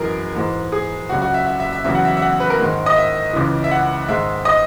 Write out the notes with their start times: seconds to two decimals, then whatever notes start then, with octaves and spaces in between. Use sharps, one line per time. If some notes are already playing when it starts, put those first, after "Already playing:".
Already playing: F#2 E3 G#3 G#4 A#4
0.35 G#2 E3 G#3
0.72 G#4
1.09 C#2 C#3 F#3 F#4
1.22 F#4
1.34 E5
1.46 E5
1.60 E5
1.72 E5
1.84 E2 C#3 F#3 E5
1.95 F#5
2.05 E5
2.17 E5
2.22 F#5
2.40 B4
2.50 A#4
2.60 G#2 D#3 G#3
2.86 D#5
2.96 E5
3.33 C#2 C#3 E3
3.64 E5
3.71 F#5
4.08 G#2 D#3 G#3 E5
4.45 D#5